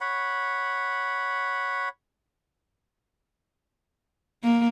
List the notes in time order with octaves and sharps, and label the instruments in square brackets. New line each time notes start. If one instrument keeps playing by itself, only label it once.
[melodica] C#5 F#5 B5
[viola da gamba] A#3